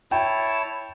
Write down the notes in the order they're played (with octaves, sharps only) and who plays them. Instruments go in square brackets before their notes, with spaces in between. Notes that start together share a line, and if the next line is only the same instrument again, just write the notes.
[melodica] E4 C#5 A5 [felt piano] G5